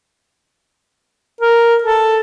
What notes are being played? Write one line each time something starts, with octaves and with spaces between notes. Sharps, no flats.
A#4
A4